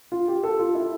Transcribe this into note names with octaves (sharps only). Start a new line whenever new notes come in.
F4
G4
A4
F4
E4